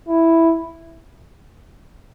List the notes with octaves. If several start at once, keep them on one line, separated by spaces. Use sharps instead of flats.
E4